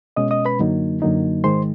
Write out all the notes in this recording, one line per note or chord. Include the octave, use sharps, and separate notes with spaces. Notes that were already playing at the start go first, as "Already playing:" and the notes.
B2 G#3 C#4 D#5 D#6
D#5 D#6
B4 B5
F#2 D3 F#3 A#3 D#4
F#2 D3 F#3 A#3 D#4
G#2 D#3 G#3 C5 C6